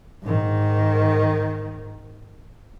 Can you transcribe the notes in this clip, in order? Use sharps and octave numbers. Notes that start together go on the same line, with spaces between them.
G#2 D#3